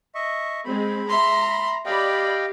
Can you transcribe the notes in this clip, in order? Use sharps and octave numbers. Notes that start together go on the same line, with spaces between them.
D#5 E5 C#6
G#3 C4 B5
E5 A#5 C6
B5
G4 D5 D#5 F5 G5 B5